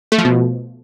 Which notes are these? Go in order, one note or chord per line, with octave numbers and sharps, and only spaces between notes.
A3
F3
B2